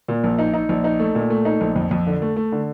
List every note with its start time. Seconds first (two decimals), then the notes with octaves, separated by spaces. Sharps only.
0.08 A#2
0.24 A#1
0.39 D#4
0.54 D#4
0.69 A#1
0.84 D#4
0.99 A3
1.15 A#2
1.30 A3
1.45 D#4
1.61 A#1
1.76 F2
1.91 F2
2.07 D3
2.22 A3
2.36 A3
2.52 D3